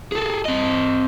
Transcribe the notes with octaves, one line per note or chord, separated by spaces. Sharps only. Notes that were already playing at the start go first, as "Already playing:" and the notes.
G#4 A4
C4 D#5